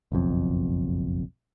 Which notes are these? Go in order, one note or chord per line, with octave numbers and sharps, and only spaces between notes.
F#1 B1 F2